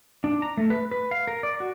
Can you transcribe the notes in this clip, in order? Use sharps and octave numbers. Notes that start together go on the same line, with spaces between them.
D4
A#5
A3
B4
B4
F5
A#4
D5
F#4